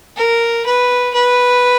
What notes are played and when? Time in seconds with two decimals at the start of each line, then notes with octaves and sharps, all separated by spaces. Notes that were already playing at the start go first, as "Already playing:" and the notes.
0.17 A#4
0.66 B4
1.14 B4